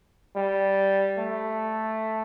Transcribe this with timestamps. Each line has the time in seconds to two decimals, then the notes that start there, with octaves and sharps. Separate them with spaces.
0.36 G3
1.18 A3